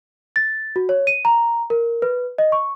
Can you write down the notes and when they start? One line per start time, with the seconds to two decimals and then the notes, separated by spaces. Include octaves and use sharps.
0.36 A6
0.76 F#4
0.89 C#5
1.07 D#7
1.25 A#5
1.70 A#4
2.02 B4
2.38 D#5
2.52 C#6